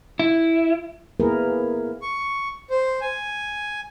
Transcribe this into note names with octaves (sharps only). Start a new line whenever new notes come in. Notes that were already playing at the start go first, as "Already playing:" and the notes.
E4
A#3 B3 E4 G#4 A#4 B4
C#6
C5
G#5